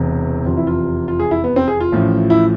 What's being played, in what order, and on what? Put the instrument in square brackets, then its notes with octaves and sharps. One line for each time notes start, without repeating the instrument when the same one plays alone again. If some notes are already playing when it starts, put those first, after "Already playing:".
Already playing: [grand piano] E1 E2 C3
F1 E2 C3 F4
E4
F4
F4
G#4
E4
B3
C4
G#4
F4
A1 A2 F3
E4